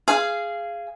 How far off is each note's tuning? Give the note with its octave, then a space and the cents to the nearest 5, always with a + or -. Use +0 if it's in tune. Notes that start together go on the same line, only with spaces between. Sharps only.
G#4 +0 F5 -20